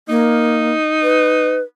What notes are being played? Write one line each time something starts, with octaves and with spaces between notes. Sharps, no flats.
A#3 D#4
B4